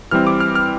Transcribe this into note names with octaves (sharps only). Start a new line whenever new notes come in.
E3 G3 C4 E4 F6
D6
F6
F6